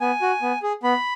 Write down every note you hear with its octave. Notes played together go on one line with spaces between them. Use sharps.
B3 G#5
F#4
B3
G#4
B3 B5